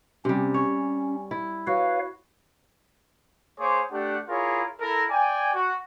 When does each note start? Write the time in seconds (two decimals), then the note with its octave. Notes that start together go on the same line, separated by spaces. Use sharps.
0.25 C3 G3 C#4
0.54 C#5
1.31 E4
1.67 F#4 B4 C#5 F5
3.60 A#3 G#4 C5 C#5 D6
3.91 A3 D4 G4 F#5
4.29 E4 F4 G#4 A#4 C#5
4.81 E4 A4 A#4
5.10 D5 G5 G#5
5.54 F#4